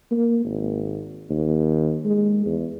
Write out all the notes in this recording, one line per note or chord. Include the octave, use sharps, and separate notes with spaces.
A#3
G#1
D#2
G#3
E2